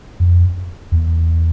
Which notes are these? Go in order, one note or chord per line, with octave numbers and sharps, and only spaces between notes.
F2
E2